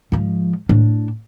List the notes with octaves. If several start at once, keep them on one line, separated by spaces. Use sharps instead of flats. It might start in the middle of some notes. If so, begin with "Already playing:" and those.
G#2 F3
A2 D4